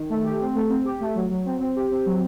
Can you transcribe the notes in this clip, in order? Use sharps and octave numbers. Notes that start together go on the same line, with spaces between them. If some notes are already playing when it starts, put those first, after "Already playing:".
Already playing: D#3
A3
G4
C4
A3
C4
G4
A3
F#3
F#3
C4
C4
G4
C4
F#3